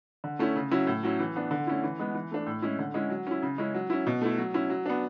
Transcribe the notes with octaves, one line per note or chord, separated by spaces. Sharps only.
D3
A3 C#4 E4
C#3
F#3 C#4 E4
A2
F#3 C#4 E4
E3
B3 D4
D3
A3 C#4 E4
E3
G#3 B3
E3
A3 D4
A2
G#3 C#4 E4
D3
G#3 C#4 E4
F#3
C#4 E4
C#3
G#3 C#4 E4
F#3
C#4 E4
B2
A3 E4
F#3
C#4 E4
F#3
B3 D4